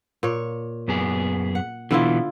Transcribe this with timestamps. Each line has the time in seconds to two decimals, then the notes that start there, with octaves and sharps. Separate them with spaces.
0.23 A#2 C#5
0.88 F#2 B3 G#4
1.55 F#5
1.91 B2 D3 E3 E4 F4